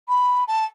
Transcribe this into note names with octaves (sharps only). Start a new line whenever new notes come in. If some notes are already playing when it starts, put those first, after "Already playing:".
B5
A5